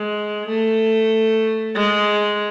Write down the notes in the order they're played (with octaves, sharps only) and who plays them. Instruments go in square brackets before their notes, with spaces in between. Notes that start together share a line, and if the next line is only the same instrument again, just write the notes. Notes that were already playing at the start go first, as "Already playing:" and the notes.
Already playing: [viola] G#3
A3
G#3